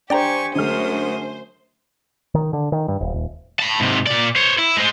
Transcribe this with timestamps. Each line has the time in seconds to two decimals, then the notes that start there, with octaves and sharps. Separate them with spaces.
0.10 D4 G4 C5 D5 G5 G#5 A#5 C#6
0.55 F#2 D3 G#3 A3 C5 D#6 F6
2.35 D#3
2.53 D3
2.72 D#3
2.88 G2
3.01 D#1
3.14 D#1
3.59 A5 B5
3.80 G#2 C3
4.07 A#2 D5
4.36 C5 C#5
4.58 E4
4.77 G#3 C5